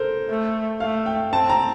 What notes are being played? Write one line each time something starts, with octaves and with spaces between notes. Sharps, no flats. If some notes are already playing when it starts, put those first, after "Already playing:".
Already playing: A4 A#4 C5
A3
A3 F5
G5
C4 A5
A#5